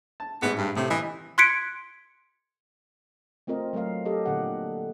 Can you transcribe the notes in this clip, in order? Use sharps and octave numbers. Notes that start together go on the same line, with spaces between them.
A5
A1 G#2 B3
G2
A2 C3
E3 D#5
C6 F#6 G#6 B6 C#7 D7
A3 C4 F4 A#4 D#5
F#3 A3 C4 A#4 F5
G4 A4 D#5
A#2 D3 F#5